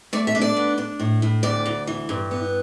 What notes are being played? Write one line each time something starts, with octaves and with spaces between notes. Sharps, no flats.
A3 D5
E5
D4
D5
B3
D4
A2
A2
D2 D5
D2
E3
G2
B3